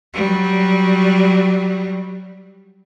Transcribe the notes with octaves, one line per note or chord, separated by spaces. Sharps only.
F#3 G3